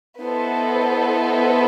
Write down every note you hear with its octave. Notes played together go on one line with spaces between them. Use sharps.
B3 E4 A4 C5 D#5